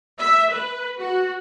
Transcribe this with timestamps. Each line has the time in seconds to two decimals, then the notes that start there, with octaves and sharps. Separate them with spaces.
0.19 E5
0.50 B4
1.00 F#4